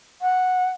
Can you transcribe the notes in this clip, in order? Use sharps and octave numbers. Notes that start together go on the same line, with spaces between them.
F#5